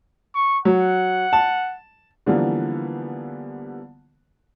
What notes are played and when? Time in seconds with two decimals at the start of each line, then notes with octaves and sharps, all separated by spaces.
0.35 C#6
0.65 F#3 F#5
1.33 A5
2.26 D3 E3 F3 G3 A#3 B3